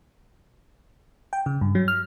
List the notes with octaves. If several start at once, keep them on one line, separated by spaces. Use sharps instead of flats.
G5
C#3
G2
F#3
F6